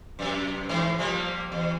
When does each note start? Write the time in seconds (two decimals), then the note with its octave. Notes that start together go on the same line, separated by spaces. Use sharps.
0.19 F#2 C3
0.69 G#2 E3
0.98 F3 G3 A#3
1.52 E2